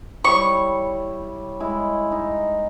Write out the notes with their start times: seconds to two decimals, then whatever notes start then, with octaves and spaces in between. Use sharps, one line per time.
0.24 G3 E4 C#5 C#6
1.60 G#3 E4
2.12 D#4